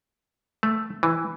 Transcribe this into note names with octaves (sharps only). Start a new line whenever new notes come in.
A3
E3